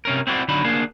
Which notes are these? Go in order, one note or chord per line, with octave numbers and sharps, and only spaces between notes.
C3 C#4 A#4
C4 E4 F#4 C#5 D5
D3 F#3 D4 D#4 B5
D2 A#3 D4 G#4